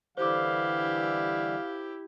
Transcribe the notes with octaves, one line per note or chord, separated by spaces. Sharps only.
D3 E3 G3 E4 G4 C5 F5 D6